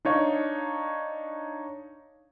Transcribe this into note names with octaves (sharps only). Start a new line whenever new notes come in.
D4 D#4 C#5 F5